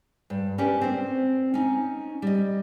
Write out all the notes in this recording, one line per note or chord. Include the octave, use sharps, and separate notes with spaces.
G2
C#4 D4 G4 A#4 B4
C4 C5
C#4 D#4
G3 D#5